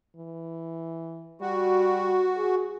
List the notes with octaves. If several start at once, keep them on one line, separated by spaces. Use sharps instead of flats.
E3
G3 F#4
G#4